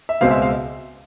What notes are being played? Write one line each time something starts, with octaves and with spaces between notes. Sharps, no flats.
E5
C#2 B2 G#3 C4 F5
E5
F5